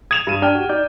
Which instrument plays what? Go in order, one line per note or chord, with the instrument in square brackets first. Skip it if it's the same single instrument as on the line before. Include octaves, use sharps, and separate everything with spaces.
[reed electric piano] D#6 [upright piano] G#6 E7 F7
[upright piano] G2 D#7
[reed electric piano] D4 [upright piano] G5 F6
[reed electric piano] F#4 G4
D#4 D5 G6